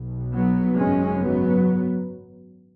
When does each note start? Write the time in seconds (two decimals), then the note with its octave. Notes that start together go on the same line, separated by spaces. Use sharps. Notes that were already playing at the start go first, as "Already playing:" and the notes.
Already playing: B1 B2
0.33 F#3 B3
0.76 G#1 F#2 C#3 G#3 C#4
1.19 F#3 B3